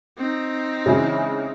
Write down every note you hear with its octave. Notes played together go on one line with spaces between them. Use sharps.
C4 D#4
C#3 E3 G#3